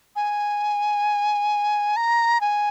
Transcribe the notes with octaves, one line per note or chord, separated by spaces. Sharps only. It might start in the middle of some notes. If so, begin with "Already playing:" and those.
G#5
A#5
G#5